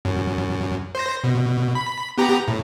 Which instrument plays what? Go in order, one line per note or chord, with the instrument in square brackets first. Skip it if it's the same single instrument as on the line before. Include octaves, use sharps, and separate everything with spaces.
[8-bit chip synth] F#2
C5 A#6
B2
B5
B3 G4 A#5
A2